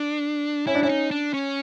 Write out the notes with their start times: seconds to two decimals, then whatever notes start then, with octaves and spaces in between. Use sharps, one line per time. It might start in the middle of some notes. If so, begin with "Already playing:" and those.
Already playing: D4
0.67 C#4 E4
0.75 D4
0.83 C#4 E4
0.89 D#4
1.11 D4
1.34 C#4